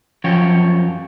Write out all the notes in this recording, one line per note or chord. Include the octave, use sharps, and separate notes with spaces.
F#2 F3 C#5 G5